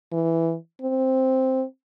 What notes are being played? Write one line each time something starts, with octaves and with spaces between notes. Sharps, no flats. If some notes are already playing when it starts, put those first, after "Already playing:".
E3
C4